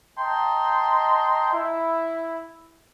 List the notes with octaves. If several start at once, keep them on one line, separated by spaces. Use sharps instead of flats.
D#5 G5 A5 A#5 C6
E4